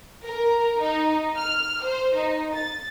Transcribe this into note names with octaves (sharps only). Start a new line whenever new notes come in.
A#4
D#4
F6
C5
D#4
A6